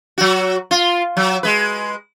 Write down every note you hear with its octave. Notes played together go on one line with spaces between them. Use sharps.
F#3 F#4
F4
F#3
G#3 B4